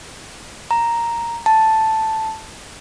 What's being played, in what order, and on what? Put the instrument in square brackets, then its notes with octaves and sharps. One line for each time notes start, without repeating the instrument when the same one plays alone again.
[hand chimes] A#5
A5